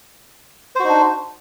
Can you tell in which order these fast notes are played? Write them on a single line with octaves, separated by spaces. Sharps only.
C5 F#4 D#4 D4